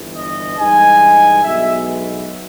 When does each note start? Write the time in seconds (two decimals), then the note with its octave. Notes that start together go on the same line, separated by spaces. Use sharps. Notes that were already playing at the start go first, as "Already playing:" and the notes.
Already playing: G1 G2 E3
0.14 D#5
0.57 G2 E3 G#3 D#4 G#5
1.43 B1 B2 G#3 B3 E5